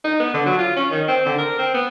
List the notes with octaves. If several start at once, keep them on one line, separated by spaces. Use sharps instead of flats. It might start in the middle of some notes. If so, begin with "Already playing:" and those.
D#4
B3
D3
F#3
F4
C#4
D#3
C4
D3
A#4
C4
B3